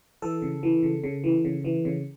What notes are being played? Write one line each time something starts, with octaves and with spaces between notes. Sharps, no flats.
E3 A4
C#3
E3
C#3
C#3
E3
C#3
E3
C#3